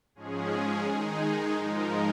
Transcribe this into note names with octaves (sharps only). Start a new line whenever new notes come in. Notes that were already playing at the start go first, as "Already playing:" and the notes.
G#2 F3 G#3 C#4 G#4
D#3 G#3 D#4 G#4
G#2 F3 G#3 D#4 A#4